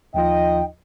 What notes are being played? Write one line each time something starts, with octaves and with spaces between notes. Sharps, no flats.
D#2 F3 D#4 F4 D#5 G5